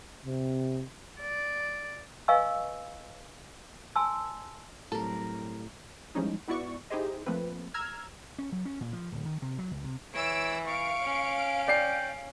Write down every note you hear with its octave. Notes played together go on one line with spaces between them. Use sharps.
C3
D5
B4 D#5 F5 G#5 C#6 E6
G#5 A5 C6 E6
A2 F#3 G3 C4 A4 A#4
E3 F3 G3 G#3 C#4 D#4
G#2 B3 E4 F#4 D5 C#6
D#4 E4 G4 G#4 C5 D#5
F3 A3 A#3 C4 B4
A#5 E6 F6 G#6
C#4
F#3
C#4
A#2
F3
D1
D#3
C3
F#3
C#2
C3
E3 C#5 E6 D7
F5 C#6 D7
C#4
D5 G5 C7